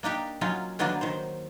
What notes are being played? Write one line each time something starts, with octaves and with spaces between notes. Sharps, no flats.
A#3 D4 D#4 G4
F#3 C#4 D#4 F4
D3 D#3 F#3 A#3 B3 D4
D#3 C5